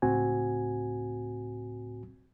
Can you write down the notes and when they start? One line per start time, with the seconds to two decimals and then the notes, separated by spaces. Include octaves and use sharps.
0.02 C#2 A2 C4 F#4 G#5